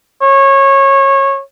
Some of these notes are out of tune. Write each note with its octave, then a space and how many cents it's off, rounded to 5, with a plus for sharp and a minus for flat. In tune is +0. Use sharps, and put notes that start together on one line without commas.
C#5 -20